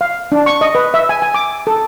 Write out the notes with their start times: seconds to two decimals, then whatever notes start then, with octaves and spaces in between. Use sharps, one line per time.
0.01 F5
0.32 D4
0.46 C#6
0.61 D#5
0.75 B4
0.94 E5
1.09 G#5
1.22 G#5
1.35 D6
1.67 A4